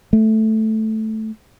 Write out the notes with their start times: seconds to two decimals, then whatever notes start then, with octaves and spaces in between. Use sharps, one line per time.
0.13 A3